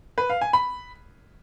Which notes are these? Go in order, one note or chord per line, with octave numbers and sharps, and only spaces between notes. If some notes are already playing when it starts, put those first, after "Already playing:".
B4
F5
G#5
B5